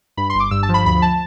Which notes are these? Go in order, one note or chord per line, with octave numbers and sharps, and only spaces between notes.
G2 B5
G1 C6
D6
G2 E6
A5
F3
B5
D2 B5
A5